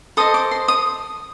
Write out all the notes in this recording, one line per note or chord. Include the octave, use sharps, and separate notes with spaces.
A4 C5 D#5 D#6
D6
C6
D#6